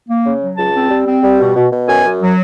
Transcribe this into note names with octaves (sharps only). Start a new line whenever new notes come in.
A#3
C#3
F#3
C#2 A5
C4
G3
C4
G3
B2
B2
B2
F#2 G#5
F#2
F#3